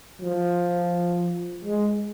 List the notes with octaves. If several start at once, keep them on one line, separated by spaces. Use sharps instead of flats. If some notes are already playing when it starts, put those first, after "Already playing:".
F3
G#3